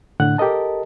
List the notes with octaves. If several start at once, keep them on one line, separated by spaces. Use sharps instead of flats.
A2 D3 F#5 F#6
G4 A4 A#4 D#5 A5